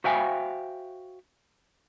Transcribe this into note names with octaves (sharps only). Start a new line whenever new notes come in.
F#4 C5 E5 F5 G5 G#5